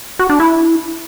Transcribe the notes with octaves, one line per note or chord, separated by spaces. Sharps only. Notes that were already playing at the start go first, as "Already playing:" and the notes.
F#4
D4
E4